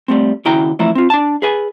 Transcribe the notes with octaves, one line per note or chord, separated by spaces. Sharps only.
G3 A3 C4
D#2 C#3 E4 F#4 G5 A#5
F2 E3 F3 A3 E4 A#5
C4 F4
D4 A5
G#4 B4 G#5